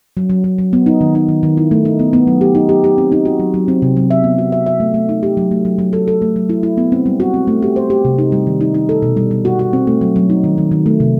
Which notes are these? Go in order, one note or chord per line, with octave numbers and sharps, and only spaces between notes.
F#3
F#3
F#3
F#3
B3
D#4
D#3
D#4
D#3
D#3
E4
A3
D#4
B3
B3
F#3
G4
D#4
G4
G4
C4
D#4
F#4
F#3
F#3
C4
C3
F#3
E5
B3
F#4
E5
E5
A3
A3
D#4
G4
F#3
A3
F#3
F#3
A4
A4
A3
F#3
E4
E4
B3
C4
G3
F#4
C4
A3
G4
C5
G4
C3
D#4
G3
D#3
D#4
D#4
A4
B2
G3
G3
F#4
F#4
C4
A3
F#3
F#3
D#4
D#3
D#3
D#3
A3
C3